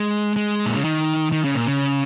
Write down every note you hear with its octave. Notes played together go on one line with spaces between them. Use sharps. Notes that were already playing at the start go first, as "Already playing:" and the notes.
Already playing: G#3
G#3
A#2
C#3
D#3
D#3
C#3
A#2
C#3